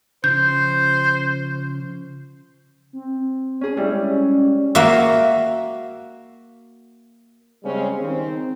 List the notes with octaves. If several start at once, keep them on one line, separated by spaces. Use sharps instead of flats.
C#3 F3 C5 G6
C4
C#4 G#4
G3 G#3 C#4 E4
A#3 F#4 E5
C#3 G3 G#3 C4 C#4
D#3 C4